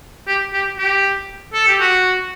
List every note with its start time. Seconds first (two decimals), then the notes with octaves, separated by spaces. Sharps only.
0.27 G4
0.53 G4
0.78 G4
1.53 A4
1.68 G4
1.80 F#4